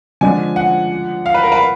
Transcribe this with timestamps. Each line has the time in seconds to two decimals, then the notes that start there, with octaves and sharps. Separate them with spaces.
0.21 D3 F3 G#3 D4 F4 G#5
0.56 F#5
1.26 F5
1.34 B4
1.43 A#4
1.52 B4